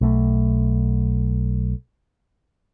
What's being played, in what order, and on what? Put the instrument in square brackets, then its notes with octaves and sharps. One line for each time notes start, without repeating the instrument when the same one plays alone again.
[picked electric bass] B1 A3